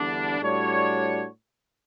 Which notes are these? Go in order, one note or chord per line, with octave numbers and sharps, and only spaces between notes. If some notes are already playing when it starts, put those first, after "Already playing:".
Already playing: E2 D3 G3 D4
A2 G3 D4 F#4 C#5